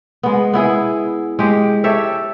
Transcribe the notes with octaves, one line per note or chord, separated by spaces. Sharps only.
G#3 B3
B3 E4 G#4
G#3 G4
G4 A4 C#5 E5